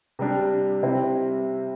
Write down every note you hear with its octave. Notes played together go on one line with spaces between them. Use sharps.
C3 G3 D4
C3 G3 C4 E4